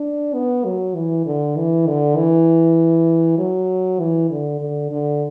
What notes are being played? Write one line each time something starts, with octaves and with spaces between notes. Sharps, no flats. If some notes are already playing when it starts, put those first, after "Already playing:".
Already playing: D4
B3
F#3
E3
D3
E3
D3
E3
F#3
E3
D3
D3
D3